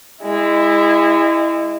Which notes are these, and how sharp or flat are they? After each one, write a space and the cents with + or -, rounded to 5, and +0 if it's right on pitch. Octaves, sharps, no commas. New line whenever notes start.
G#3 -30 E4 +0